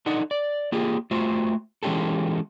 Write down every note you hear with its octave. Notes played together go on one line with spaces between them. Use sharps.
D4 D#4 A4 F#5
D5
A#3 F4 G4 G#4
A3 F4 F#4 C5
E3 G#3 C#4 F4 G4 A4